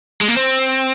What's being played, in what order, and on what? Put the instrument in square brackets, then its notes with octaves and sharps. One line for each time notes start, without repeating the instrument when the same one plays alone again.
[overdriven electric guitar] G#3
A#3
C4